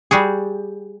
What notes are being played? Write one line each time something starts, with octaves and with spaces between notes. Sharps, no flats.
G3 F#4 G#4